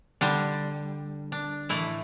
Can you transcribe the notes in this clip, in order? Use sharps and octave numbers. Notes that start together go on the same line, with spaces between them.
D3 G3 D4
D4
A2 E3 A3 E4